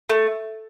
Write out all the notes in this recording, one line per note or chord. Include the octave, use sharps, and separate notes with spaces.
A3